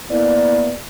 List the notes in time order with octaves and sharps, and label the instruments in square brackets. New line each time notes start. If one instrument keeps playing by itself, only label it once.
[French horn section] A#3 B3 E4 [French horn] D5